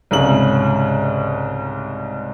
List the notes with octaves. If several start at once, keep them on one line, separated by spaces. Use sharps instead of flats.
C2 G#2 C#3 F#7